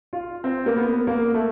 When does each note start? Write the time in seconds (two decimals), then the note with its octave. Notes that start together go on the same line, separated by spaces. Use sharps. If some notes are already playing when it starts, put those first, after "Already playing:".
0.13 F4
0.44 C4
0.66 A#3
0.77 B3
1.07 A#3
1.34 A3